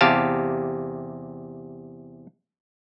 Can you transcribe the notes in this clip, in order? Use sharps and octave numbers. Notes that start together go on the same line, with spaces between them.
E2 C3 G4 F5 A5